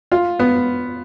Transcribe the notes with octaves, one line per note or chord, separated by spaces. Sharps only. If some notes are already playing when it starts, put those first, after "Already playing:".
F4
B3